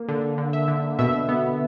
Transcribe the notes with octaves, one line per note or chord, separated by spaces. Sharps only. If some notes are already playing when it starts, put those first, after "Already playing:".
Already playing: A#3
D3
D3
E5
D3
B2 E5
B3